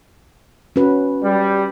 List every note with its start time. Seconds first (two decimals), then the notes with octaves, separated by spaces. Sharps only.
0.76 C#4 F#4 B4
1.23 G3